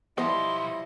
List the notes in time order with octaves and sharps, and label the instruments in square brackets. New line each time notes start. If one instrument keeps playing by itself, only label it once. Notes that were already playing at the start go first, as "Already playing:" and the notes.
[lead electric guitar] B1 C6 [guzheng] F3 G3 [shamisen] B3 C5 [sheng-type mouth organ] E4 D#5